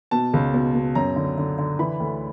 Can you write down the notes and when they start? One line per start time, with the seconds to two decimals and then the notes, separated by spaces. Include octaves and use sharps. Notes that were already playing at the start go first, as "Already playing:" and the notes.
0.11 B2 A5
0.33 C#2
0.54 B2
0.74 B2
0.95 F#2 A#5
1.16 D3
1.38 D3
1.58 D3
1.79 E3 B5
2.00 D2